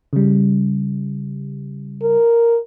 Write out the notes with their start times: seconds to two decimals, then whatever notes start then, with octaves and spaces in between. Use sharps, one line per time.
0.13 C#3 G3
2.02 A#4